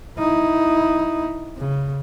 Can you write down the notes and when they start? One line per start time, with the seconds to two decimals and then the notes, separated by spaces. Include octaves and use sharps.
0.18 D#4 E4
1.57 C#3